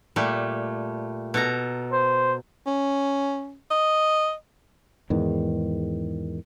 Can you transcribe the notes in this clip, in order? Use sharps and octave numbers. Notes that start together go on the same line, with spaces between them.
A#2 G3 A3
B2 A4 A#5
C5
C#4
D#5
E2 G#2 D#3